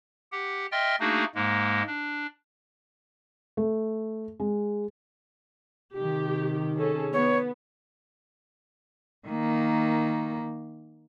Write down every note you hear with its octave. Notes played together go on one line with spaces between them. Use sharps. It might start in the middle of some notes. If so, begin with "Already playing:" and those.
G4 F#5
D#5 E5 G5 C6 F6 A6
A3 A#3 D4 D#4 F#4 G#4
G#2 G#3 A#3
D4
A3
G#3
C3 D#3 G4
C#4 G#4 A4
B3 C#5
D#3 A#3